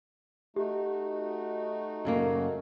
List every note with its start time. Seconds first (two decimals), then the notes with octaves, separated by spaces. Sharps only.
0.56 A3 D#4 F#4 G4
2.05 F#2 C#3 A#3